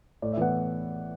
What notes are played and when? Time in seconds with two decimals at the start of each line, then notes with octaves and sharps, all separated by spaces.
0.22 A2 D5
0.32 E5
0.37 E3 B3 F#5